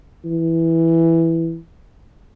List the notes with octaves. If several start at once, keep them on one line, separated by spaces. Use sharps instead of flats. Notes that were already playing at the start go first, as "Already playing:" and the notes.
E3